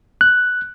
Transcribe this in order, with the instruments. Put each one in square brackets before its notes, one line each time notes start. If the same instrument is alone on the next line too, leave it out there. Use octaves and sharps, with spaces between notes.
[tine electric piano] F#6